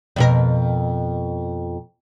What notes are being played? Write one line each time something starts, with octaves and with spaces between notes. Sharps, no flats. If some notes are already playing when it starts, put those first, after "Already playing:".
F2 B2 A#4